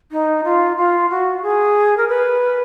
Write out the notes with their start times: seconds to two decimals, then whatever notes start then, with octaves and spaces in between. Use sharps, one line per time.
0.12 D#4
0.44 F4
0.77 F4
1.10 F#4
1.43 G#4
1.97 A#4
2.08 B4